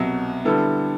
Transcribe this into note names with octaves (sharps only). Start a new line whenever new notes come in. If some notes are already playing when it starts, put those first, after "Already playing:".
Already playing: C2 B2 F#3
D3 G3 B3 E4 A4